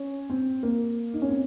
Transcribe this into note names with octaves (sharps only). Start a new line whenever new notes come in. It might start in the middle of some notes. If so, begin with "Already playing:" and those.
Already playing: C#4
C4
A#3
D#4
C#4
C4